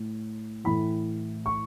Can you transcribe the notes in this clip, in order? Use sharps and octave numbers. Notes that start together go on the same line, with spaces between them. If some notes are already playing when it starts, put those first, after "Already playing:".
Already playing: A2
A2 E3 B5
C#6